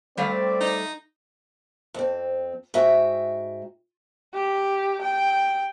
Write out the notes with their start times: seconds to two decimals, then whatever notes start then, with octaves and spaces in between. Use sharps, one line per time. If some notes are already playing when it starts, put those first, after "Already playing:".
0.17 G3 A3 C4 D5 F5
0.61 D#4
1.94 F2 C4
2.74 G#2 F#4 E5 G5
4.34 G4
5.02 G5